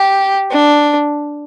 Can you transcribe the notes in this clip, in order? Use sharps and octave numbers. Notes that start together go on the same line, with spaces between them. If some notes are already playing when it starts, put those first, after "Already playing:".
Already playing: G4
D4